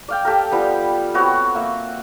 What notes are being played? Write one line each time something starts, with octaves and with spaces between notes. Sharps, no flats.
D5 F5 G5
G4 A4 A#4
F3 G3 B3
B3 C4 F#4 C#5
A#3 E5